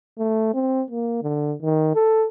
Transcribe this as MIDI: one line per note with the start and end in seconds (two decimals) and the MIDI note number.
0.18 0.52 57
0.54 0.83 60
0.90 1.20 58
1.22 1.55 50
1.62 1.94 51
1.95 2.26 69